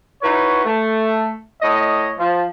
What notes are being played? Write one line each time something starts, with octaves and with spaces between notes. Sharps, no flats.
D#4 E4 F#4 B4 C#5
A3
A2 C#5 D#5
F3